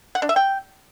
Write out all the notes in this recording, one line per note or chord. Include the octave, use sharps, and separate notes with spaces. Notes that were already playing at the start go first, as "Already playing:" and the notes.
F#5
D4
E5
G5